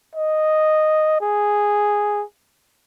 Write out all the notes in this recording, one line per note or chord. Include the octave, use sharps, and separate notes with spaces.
D#5
G#4